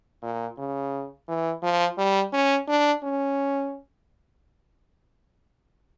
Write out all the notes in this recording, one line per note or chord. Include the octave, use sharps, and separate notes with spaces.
A#2
C#3
E3
F3
G3
C#4
D4
C#4